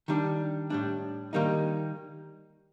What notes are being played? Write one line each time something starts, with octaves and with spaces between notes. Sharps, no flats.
D#3 G3 D4
A2 G3 D4
D#3 G3 A#3 D#4